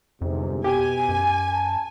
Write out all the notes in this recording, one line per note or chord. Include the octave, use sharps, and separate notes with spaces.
G1 F2 G#2 C3
B2 G4 G#5
F#2
A5